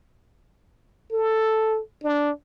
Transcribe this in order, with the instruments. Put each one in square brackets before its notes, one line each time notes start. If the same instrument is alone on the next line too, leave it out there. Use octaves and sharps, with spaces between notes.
[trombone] A4
D4